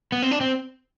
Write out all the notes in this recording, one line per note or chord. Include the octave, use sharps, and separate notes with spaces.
B3
C4
D4
C4